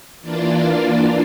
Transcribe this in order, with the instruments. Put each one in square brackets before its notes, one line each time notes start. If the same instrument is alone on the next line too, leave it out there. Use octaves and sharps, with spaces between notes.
[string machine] E3 A#3 D4 F4 D5